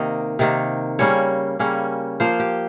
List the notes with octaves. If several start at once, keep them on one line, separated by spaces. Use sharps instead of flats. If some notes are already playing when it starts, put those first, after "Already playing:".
Already playing: C3 D#3 A#3 D#5
C3 D#3 A#3
C#3 G3 A#3 C#4 C#5
C#3 G3 A#3 C#4
F3 A#3 F4 C5
G4